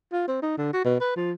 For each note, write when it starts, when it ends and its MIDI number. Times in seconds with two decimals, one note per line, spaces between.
0.12 0.27 65
0.28 0.39 60
0.43 0.57 63
0.58 0.71 50
0.73 0.83 66
0.84 0.96 47
1.00 1.13 71
1.16 1.32 53